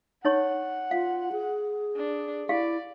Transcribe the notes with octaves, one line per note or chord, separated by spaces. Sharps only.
D#4 C#5 F#5 C#6
F4 F5
G#4
D4
E4 G4 D5 F5